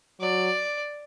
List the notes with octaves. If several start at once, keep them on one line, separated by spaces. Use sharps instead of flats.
F#3 D5